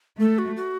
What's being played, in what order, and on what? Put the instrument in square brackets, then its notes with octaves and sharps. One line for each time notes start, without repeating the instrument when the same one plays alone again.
[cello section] A3 [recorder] A4
[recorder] F#4
F#4